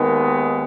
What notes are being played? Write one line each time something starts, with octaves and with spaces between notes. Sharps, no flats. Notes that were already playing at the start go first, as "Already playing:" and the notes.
Already playing: D#2 D#3 G#3 B3